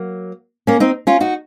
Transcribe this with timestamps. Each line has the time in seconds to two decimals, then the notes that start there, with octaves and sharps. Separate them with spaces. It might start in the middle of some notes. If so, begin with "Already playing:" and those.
Already playing: F#3 A#3
0.67 A#3 C#4
0.80 C4 D#4
1.07 C#4 F4
1.20 D#4 F#4